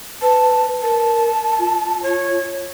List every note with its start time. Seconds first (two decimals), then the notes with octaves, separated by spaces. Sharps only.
0.22 B4 A5
0.83 A#4 A5
1.59 F4
2.03 C#5